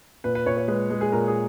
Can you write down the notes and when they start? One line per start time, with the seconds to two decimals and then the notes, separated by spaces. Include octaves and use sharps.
0.24 A#2 B4
0.35 B4
0.46 A#2 C#5
0.57 C#5
0.68 G#3 B4
0.91 G#3
1.01 G#4
1.12 A#2 A#4
1.28 G#4